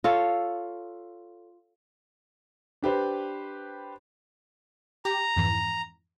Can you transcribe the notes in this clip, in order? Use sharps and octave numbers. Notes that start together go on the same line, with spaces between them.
F4 A4 C#5 F5
D4 G4 B4 C5
G4 A#5
F2 G#2 E3